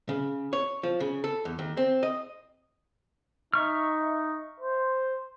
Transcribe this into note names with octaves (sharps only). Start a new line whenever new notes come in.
C#3
C#5
F3
C#3
A4
E2
D#2
C4
D#5
D#4 E5 C#6 F6
C5